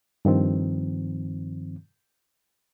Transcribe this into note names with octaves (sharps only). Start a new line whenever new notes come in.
G2 D#3 F3 C4